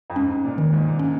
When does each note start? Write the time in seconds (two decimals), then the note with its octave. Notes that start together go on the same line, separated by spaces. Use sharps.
0.10 F2
0.16 G#2 C#4
0.44 A#2
0.58 D#3
0.73 G#2
0.88 A#2
0.99 C#4